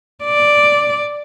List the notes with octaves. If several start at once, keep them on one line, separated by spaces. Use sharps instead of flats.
D5